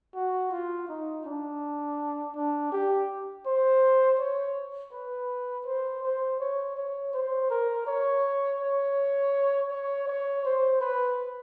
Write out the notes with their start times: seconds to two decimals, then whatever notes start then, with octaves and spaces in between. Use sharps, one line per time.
0.15 F#4
0.52 F4
0.89 D#4
1.25 D4
2.36 D4
2.72 G4
3.46 C5
4.19 C#5
4.93 B4
5.66 C5
6.03 C5
6.40 C#5
6.76 C#5
7.14 C5
7.50 A#4
7.87 C#5
8.60 C#5
9.71 C#5
10.08 C#5
10.45 C5
10.81 B4